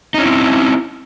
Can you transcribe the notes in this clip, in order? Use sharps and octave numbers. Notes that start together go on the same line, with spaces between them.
C4 C#4 D#4 E4